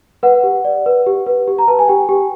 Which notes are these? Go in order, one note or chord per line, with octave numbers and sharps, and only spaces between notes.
B4 F#5
G4
D5
B4
G4
B4
G4
A#5
B4 A5
G#5
G4 G5
G4